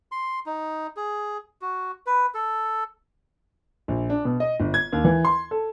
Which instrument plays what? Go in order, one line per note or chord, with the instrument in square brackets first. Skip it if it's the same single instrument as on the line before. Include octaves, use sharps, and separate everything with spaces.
[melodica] C6
D#4
G#4
F#4
B4
A4
[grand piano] A#1
D4
B2
D#5
G1
G#6
D#2
E3
C6
A4